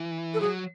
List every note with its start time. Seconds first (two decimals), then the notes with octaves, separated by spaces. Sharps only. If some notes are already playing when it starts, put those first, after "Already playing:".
Already playing: E3
0.34 A4
0.40 F#3 G#4